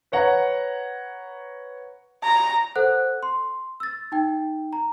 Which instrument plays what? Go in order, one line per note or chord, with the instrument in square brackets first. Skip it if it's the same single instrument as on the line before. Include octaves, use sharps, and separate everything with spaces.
[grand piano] B4 C#5 F#5 A#5
[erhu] A#5
[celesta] A4 C5 F#5 F#6
C6
E6 A6
D#4 G5
A#5